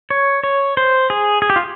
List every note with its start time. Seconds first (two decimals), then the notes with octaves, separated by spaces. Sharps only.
0.10 C#5
0.44 C#5
0.77 C5
1.10 G#4
1.42 G#4
1.50 G4
1.56 F4